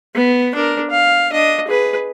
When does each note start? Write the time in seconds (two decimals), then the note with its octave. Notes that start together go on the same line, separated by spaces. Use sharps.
0.15 B3
0.55 D4 A#4
0.90 F5
1.32 D4 D#5
1.68 G#4 B4